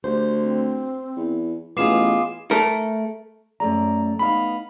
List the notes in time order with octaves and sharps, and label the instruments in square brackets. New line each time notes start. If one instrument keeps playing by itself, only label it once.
[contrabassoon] D2 [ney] G4 [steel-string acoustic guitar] C5
[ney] C4
[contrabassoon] E2
[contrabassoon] A1 [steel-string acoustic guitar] B3 F4 G#4 [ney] D#5 [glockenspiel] D6 C7 E7
[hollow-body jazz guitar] A3 A#4
[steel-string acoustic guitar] F#2 A3 D5 [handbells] A#5
[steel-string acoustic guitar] B3 D#4 F5 [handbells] B5